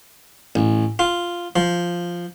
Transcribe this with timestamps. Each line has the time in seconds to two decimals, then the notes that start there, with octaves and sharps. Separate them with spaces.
0.55 A1
0.99 F4
1.56 F3